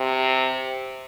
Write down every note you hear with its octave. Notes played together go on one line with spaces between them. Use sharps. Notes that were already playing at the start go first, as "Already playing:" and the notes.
Already playing: C3